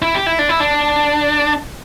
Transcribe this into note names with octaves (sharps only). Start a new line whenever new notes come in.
E4
G4
E4
D4
E4
D4